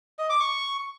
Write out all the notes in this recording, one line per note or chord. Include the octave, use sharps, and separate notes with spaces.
D#5
D6
C#6